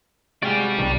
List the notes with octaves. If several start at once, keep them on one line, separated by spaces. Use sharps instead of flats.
C3 G#3 F#4 D5 F5 G5
B1 D#3 F3 G3 D4